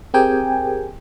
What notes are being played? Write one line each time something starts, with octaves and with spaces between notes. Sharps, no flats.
C4 G4 G#4 A#4 G5 G#5